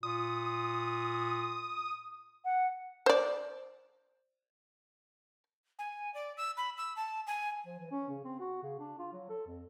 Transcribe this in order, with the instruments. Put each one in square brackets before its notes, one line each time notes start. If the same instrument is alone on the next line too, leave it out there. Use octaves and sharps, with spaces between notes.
[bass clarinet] A#2 [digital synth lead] D#6
[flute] F#5
[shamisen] C5 D5
[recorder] G#5
D5
E6
B5
E6
A5
G#5
[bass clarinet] F3
E3
C#4
C#3
C4
F#4
C#3
D4
F4
F#3
A4
F2